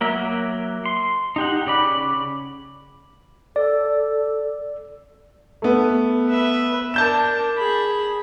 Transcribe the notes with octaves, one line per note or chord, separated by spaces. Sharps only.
F#3 A#3 A#4 E5
C6
D#4 G4 F#5
C#3 D5 B5
A4 D5
A3 B3
B4 E5
D4 A#4 A5 G6 E7
G#4 B5